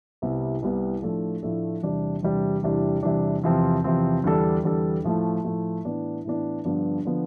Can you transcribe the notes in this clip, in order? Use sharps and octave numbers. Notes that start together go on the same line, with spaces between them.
C2 C3 G3 B3 E4
C2 C3 G3 B3 E4
A2 F3 A3 D4 A4
A2 F3 A3 D4 A4
E2 C3 G3 D4 G4
E2 C3 G3 D4 G4
E2 C3 E3 G3 D4
E2 C3 E3 G3 D4
E2 C3 F3 C4
E2 C3 F3 C4
E2 D3 G3 D4 A4
E2 D3 G3 D4 A4
A2 F3 A3
A2 F3 A3
A2 E3 B3 D4
A2 E3 B3 D4
G2 D3 F3 B3 D4
D3 F3 B3 D4